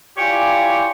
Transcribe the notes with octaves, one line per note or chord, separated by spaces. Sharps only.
E4 F4 G4 C#5 D5 G#5